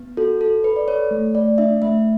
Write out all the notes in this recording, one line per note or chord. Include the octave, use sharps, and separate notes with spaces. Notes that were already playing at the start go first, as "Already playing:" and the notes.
Already playing: B3
F#4 A4
A4
A4 B4
D5
A4 C#5
A3
A3 D5
D4 E5
A3 E5